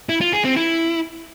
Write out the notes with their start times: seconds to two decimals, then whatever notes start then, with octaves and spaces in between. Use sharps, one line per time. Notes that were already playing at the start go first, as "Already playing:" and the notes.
0.09 E4
0.21 F4
0.33 G#4
0.45 C4
0.56 E4